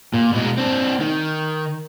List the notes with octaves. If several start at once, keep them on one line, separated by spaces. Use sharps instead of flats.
A#2
B2 G#3
C4 D4
D#3